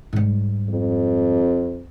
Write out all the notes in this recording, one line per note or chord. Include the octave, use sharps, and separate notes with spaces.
G#2 G3
F2